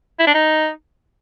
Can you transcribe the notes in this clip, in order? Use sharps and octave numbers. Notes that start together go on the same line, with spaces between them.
E4
D4
D#4